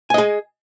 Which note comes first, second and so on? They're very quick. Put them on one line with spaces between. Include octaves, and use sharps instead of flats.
G#5 D#5 G#4